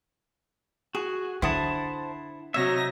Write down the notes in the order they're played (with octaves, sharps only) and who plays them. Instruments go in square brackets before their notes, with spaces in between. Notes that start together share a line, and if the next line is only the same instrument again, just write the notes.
[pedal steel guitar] F#4 [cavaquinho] G#4
[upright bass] D3 [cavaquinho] E4 F#5 D#6 [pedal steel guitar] C5 A5
[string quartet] C3 F#3 A#6 [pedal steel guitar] D#4 E5 [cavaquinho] C#5